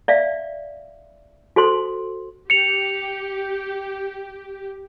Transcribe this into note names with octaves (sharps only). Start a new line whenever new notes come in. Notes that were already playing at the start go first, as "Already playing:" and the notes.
D5 E5 F5
F#4 A4 C5 C6
G4 C#7 F7